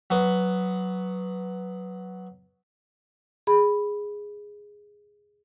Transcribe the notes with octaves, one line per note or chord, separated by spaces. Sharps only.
F#3 B3
G#4 B5